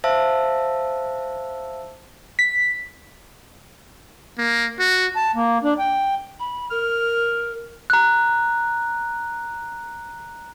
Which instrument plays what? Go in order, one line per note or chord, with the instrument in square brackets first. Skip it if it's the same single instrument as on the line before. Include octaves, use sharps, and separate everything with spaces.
[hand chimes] C5 E5 F5 A5 E6
[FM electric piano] B6
[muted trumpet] A#3
F#4
[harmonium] A5
A#3
D4
G5
[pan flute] B5
[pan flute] A#4 [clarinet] F6
[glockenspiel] A#5 F#6